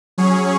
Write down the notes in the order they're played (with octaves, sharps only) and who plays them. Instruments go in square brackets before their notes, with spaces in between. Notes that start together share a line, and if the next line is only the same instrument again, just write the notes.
[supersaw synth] F#3 C#4 G#4 C#5